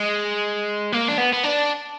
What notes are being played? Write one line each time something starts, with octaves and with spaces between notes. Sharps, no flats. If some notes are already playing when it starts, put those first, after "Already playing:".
Already playing: G#3
A#3
D4
B3
B3
D4